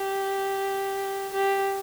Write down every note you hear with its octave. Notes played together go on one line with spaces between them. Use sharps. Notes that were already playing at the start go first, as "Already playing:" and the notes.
Already playing: G4
G4